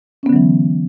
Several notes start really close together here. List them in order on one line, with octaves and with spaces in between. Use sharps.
C#4 B3 D3 F#3 E3